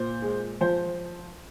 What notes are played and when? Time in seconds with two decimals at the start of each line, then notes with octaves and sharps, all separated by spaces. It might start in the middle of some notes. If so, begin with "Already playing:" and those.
Already playing: A#2 C5
0.22 G#3
0.61 F3 C5